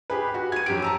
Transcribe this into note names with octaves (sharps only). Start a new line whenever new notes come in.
G4 G#4 B4
F#4
G#6 D#7
F#2 G4 D7
A5 A#5 E6